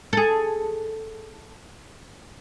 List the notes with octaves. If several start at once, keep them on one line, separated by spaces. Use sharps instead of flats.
G#4 A4